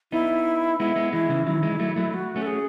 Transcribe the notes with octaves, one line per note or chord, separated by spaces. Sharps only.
B3 D#4 E4
G#3 B3 E4
G#3 B3
E3 G#3 E4
C#3 E3
D#3 F#3 E4
E3 G#3
F#3 A3
F#3 A3
F#4
A3 C#4
A4
G#4